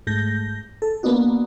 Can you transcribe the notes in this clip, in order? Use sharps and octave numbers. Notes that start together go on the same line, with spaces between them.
G#2 A3 G6 A#6
A4
A#3 B3 D4 D#4 F#4